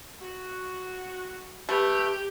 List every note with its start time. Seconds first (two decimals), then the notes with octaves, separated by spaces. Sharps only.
0.21 F#4
1.69 A3 G4 B4